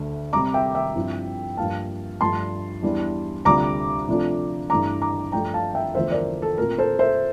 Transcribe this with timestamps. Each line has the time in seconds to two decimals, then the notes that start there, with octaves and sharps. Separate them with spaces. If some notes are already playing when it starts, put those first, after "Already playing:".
Already playing: D2 D3 A3
0.33 C3 G3 C4 A#5 D6
0.54 E5 G5
0.75 E5 G5
0.95 G2 F3 C4 E4
1.57 G2 F3 A#3 F5 A5
2.21 G2 F3 A3 D4 A5 C6
2.82 E2 E3 G3 D4
3.45 D2 C3 G3 D4 F4 A#5 D6
4.08 C3 F3 A3 D4 F4
4.70 G2 E3 A3 D4 A#5 D6
5.02 A#5 D6
5.32 G2 F3 A3 D4 G5 A#5
5.54 F5 A5
5.75 E5 G5
5.95 E2 D3 F3 A3 C5 E5
6.11 A#4 D5
6.42 A4
6.58 A#2 A3 C4 F4 A#4
6.78 A4 C5
6.99 C5 E5